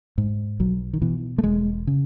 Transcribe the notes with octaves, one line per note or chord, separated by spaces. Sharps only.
G#2
B1 F#3
D#3
B2 E3
A3
E1 G#3
C#3